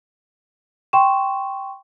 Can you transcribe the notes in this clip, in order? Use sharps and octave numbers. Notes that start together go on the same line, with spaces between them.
G5 C6 C#6 E7